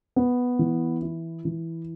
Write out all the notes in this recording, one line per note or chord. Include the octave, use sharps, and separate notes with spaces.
B3
E3
E4
E3